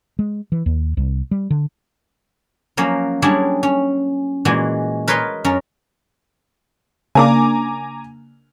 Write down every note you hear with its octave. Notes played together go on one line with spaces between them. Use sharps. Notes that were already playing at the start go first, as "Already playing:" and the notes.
G#3
E3
D#2
C2
G3
D3
F3 F#3 A#3 C#4
F#3 G3 C#4 D4 E4 G#4
C#4
A#2 E3 G#3 F#4
A#4 B4 C#5 D#5 C6
F#2 C#4 A#4
C#3 A#3 D4 G#5 A#5 D6